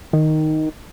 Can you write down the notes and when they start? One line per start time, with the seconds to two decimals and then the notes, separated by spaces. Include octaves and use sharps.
0.13 D#3